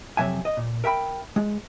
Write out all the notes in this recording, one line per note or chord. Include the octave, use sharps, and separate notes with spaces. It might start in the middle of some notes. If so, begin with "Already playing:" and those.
F2 C3 F#3 E5 G#5
D#5
A#2
A#4 E5 G5 B5
G#3